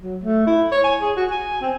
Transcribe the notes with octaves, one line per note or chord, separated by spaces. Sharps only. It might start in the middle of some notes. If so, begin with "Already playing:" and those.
F#3
A3
E4
C#5
G#5
G#4
F#4
G#5
C4